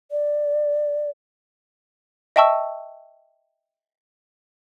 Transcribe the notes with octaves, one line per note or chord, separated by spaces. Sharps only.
D5
D#5 E5 G5 A5 C#6 E6